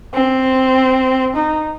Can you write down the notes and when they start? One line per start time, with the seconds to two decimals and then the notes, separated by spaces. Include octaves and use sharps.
0.13 C4
1.35 D#4